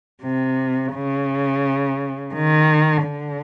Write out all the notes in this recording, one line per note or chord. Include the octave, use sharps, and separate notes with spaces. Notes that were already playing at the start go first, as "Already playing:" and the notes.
C3
C#3
D#3
D3